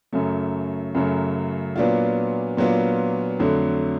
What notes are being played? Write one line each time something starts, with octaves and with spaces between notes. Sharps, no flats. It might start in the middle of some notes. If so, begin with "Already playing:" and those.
F#2 C#3 F#3 A3
F#2 C#3 F#3 A3
A#2 F#3 B3 D4 F4
A#2 F#3 B3 D4 F4
F2 D3 F#3 A3